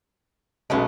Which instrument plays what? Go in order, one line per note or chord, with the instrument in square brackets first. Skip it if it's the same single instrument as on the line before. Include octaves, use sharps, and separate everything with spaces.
[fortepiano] B1 B2 [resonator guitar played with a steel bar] G#3 A3 C#4